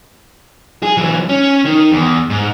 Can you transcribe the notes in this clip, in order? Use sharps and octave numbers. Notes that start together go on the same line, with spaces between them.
G#4
E3 F#3
C#4
D#3
E2
G#2